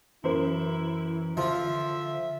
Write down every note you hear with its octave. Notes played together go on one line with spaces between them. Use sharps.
F#2 E3 E4 C5
D3 F3 F4 E5